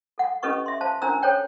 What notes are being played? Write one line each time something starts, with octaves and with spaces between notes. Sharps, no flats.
A4 F#5
C#4 G4 A4 B4 D#5 C#6
E5 C6
C5 F5 A5
C#4 D4 A#4 C5 A#5 E6
A4 C5 C#5 G5